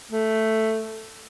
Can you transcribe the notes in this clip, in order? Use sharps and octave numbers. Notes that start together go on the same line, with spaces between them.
A3